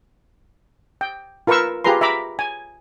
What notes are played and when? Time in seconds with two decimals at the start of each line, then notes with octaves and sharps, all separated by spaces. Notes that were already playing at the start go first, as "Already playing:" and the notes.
1.01 G5
1.47 F4 A#4 B4 F5 C#6 E6
1.84 F4 G4 G#4 B4 A#5 C6
2.01 E5 A#5 B5 D6
2.39 G#5